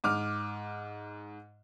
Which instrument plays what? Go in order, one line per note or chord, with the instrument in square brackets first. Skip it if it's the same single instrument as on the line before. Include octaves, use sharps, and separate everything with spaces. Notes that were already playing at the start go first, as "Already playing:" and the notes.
[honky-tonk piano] G#2 D6 F6